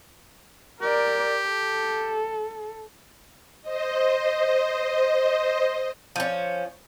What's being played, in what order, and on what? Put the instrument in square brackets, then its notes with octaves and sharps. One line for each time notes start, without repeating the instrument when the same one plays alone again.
[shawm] G4 [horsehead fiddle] A#4 D5
[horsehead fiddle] A4
[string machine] C5 D#5
[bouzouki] F3 C#4